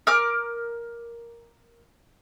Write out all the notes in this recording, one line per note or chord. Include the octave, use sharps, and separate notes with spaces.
A#4 D6 F6